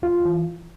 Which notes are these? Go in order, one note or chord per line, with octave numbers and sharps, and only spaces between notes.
E2 F4
E3